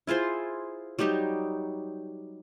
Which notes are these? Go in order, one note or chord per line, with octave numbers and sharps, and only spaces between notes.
E4 F4 G#4 C5
F#3 G3 D#4 G4